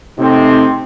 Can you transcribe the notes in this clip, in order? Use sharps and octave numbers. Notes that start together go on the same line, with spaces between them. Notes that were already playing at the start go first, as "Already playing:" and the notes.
C3 A3 C4 D#4